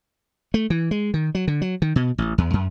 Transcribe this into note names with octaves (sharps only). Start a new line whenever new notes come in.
A3
E3
G#3
D#3
F#3
D3
F#3
D#3
B2
A1
E2
F#2